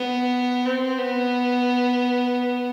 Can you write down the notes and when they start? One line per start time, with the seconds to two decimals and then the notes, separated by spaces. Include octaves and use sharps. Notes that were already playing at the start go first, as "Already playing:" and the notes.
Already playing: B3
0.65 C4
0.99 B3